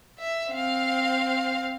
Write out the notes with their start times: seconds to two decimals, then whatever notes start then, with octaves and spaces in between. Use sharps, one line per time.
0.19 E5
0.51 C4 F5